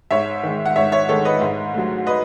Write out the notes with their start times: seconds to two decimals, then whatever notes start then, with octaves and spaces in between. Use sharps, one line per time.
0.11 G#2 C#5 E5
0.43 D#3 G#3
0.66 F#5
0.76 G#2 C#5 E5
0.92 C#5 E5
1.09 D#3 G#3 A4 C#5
1.25 B4 D#5
1.41 G#2
1.74 F#3 A3
2.07 B4 D#5